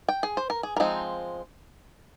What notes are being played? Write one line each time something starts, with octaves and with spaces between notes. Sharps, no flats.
G5
G#4
C5
A#4
G#4
A#4
F3 G#3 C4 D#4